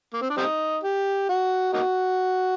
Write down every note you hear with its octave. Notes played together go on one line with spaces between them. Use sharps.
A#3
C4
D4
G3 C4 D#4
G4
F#4
A#3 D#4 F#4